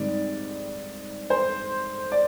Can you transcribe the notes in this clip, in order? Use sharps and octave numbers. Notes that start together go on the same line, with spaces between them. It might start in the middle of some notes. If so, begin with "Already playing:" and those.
Already playing: G#2 D#3 G3 C4 D5
C5
D5